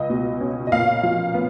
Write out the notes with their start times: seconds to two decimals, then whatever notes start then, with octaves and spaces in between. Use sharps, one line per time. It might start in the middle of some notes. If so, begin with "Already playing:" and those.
Already playing: C#2 D#5
0.10 B2
0.41 C#4
0.67 D#5
0.72 A#2 F5
1.03 F3
1.34 B3